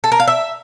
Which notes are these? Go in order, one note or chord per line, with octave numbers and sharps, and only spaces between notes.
A4
A#4
F5
E5